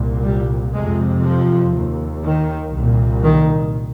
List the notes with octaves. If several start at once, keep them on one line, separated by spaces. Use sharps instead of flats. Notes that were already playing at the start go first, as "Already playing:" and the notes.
Already playing: C2 A#2
G3
F2 C3 G#3
F3
D#2
D#3
C2 A#2
D#3